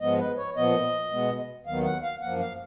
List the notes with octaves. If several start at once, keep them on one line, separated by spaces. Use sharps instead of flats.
G#2 F3 G#3 B3 D#5
B4
C#5
A#2 F3 B3 D#5
B2 G#3 B3
D#2 D#3 F#3 B3 F5
F#5
F5
F#2 F3 A#3 F#5
F5